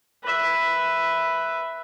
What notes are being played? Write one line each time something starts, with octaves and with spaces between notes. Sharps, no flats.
B4 E5